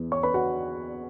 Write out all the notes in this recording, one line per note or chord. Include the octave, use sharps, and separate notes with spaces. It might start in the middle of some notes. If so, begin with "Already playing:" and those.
Already playing: E2 E3
C#5 C#6
B4 B5
F#4 F#5